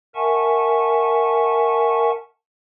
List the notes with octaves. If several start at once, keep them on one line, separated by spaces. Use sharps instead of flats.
A#4 E5 F#5 G#5 A5 C#6